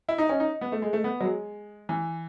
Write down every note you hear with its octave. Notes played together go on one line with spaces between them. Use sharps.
E4
D#4
C#4
D#4
B3
A3
G#3
A3
B3
F#3
G#3
E3